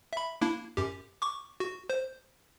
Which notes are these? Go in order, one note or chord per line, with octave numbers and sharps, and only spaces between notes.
E5 B5
A#3 D4 E4
F#2 G4
C#6 D6
F#4
C5